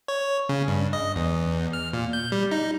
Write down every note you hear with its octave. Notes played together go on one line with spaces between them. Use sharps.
C#5
C#3
G2
D#5
E2
F6
A#2
G6
G3
D#4